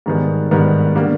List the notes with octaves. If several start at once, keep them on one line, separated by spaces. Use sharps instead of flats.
G#2 D#3 G3 B3
G#2 D#3 G3 B3
D3 G3 A#3